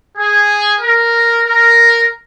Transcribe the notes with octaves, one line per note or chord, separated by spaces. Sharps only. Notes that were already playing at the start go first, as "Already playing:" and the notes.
G#4
A#4
A#4